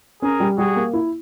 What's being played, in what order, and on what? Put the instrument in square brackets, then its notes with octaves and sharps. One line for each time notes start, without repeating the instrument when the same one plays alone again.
[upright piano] C#4 [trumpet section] G#4 A#4
[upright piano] G3
[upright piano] G3 [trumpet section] F#4 G#4
[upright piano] A#3
E4